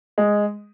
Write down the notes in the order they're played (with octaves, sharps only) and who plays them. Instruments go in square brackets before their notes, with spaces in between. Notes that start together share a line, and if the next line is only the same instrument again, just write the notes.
[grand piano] G#3